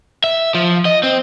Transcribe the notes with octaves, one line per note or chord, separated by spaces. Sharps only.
E5
F3
D#5
C4